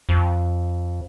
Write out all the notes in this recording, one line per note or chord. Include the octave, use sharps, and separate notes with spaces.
F2